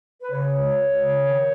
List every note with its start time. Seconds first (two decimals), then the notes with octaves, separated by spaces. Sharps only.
0.22 B4
0.31 C#3 C#5
0.54 C#2
0.76 C#2
0.99 C#3
1.21 D#3